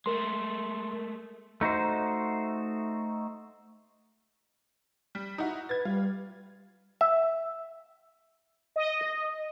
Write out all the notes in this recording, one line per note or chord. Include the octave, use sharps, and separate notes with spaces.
G#3 A3 A#4 C6
A3 D#4 F#4 C5
G3
D#4 E4 F#4
B4 G#6 A6
G3 F4
E5
D#5